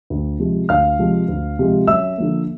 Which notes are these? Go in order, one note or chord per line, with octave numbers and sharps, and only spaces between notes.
D2
C3 F3 G#3
D2 F5 F6
C3 F3 G#3
D2
C3 F3 G#3
F#2 E5 E6
D3 F3 A#3